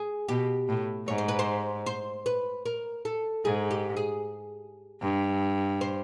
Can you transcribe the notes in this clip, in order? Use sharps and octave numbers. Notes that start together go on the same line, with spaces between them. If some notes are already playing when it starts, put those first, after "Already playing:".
Already playing: G#4
B2 G4
A2
G#2 C#5
C5
B4
C5
C5
B4
A#4
A4
G#2 G#4
G4
G#4
G2
C5